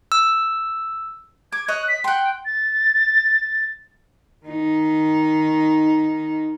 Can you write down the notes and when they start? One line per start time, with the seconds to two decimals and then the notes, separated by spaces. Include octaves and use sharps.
0.12 E6
1.52 D6 G#6
1.68 C#5 D#5 D#6 F#6
1.88 B6
2.04 F#5 G5 C6
2.46 A6
4.46 D#3 D#4